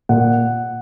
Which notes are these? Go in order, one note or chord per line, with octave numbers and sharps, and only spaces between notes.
A#2 F#5